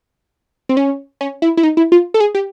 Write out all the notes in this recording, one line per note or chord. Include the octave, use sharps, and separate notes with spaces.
C4
C#4
C#4
E4
E4
D#4
E4
F4
A4
G#4
G4